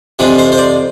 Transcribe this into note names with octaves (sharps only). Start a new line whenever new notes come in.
F2 C3 F3 G#3 D4
C5
C5
D5